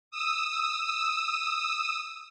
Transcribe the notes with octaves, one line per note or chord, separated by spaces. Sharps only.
D#6 E6